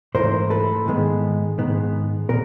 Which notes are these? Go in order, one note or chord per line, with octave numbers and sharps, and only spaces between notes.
G#2 E3 A3 A#4 C5
A4 B4
G#2 D#3 G#3 B3
G#2 D#3 G#3 B3
A#2 B3 A#4